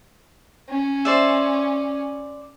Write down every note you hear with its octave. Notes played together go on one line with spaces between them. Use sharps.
C#4
C5 D5 E5